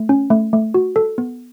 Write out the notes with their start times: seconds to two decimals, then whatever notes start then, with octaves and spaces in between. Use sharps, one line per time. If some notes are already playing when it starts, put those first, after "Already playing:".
Already playing: A3
0.09 C#4
0.30 A3
0.53 A3
0.74 F#4
0.96 A4
1.18 B3